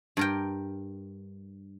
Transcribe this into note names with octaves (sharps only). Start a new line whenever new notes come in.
G2 A#4 G5